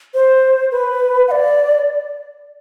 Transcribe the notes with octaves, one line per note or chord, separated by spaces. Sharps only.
C5
B4
F#5
D5